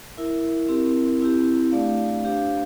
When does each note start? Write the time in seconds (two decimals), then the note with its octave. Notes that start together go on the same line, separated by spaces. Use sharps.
0.17 E4 A#4 E5
0.68 C4 E4 G4 A#4
1.21 C4 E4 G4
1.72 A3 D4 G4 D5 F5
2.23 D4 G4 C5 F5